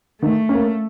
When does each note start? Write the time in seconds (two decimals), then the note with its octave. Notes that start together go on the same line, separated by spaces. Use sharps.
0.22 D#3 A3
0.49 C#4
0.54 A#3